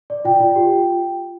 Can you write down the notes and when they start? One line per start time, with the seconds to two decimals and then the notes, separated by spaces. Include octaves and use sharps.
0.10 D5
0.25 F4 G5
0.40 F4
0.55 G4